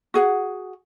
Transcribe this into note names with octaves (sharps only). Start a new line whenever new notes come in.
F#4 G#4 F#5